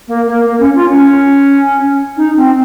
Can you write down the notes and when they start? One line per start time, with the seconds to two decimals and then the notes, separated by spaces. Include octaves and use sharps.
0.08 A#3
0.27 A#3
0.46 A#3
0.60 C#4
0.75 F4
0.88 C#4
2.17 D#4
2.37 C4